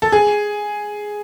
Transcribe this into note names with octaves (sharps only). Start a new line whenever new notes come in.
A4
G#4